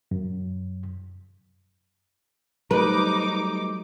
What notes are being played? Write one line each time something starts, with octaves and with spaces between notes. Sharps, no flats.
F#2
F#3 G3 A3 D#4 B4 D6